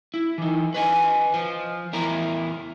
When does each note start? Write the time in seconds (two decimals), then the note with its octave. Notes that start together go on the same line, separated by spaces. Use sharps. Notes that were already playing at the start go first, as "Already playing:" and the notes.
0.14 E4
0.38 E3 D#4
0.74 B4 D#5 G#5
1.34 F3
1.93 E2 E4 A#4